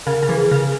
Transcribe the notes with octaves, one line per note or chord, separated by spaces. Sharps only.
C#3 A#4
C#3
E3 A#4
G#4
C#3